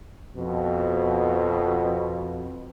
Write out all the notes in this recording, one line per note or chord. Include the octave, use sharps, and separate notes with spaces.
F2 B2